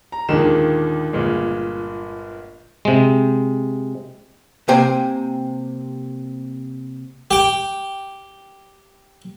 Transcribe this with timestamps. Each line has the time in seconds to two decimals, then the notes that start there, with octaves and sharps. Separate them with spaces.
0.12 A#5
0.29 D#2 A#2 D3 D#3 G#3 E7
1.13 G1 A#2 G#3
2.85 C3 G#3
4.68 C3 A#3 C5 G5 G#5
7.31 G4 G5